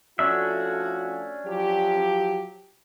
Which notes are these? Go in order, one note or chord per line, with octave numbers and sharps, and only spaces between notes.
F3 A3 C#4 D4 F#4 E5
F3 F#3 G4